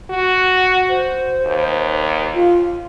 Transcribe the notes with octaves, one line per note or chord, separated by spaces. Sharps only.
F#4
C5
D#2
F4